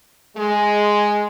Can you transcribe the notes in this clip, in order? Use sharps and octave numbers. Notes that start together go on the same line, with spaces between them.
G#3